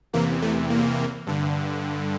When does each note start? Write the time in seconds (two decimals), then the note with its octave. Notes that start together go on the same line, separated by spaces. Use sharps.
0.13 E2 C3 E3 A#3
0.42 A3
0.70 A#3
1.27 G2 D3